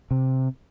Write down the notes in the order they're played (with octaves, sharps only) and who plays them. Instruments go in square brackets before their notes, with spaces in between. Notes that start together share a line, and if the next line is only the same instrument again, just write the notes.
[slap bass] C3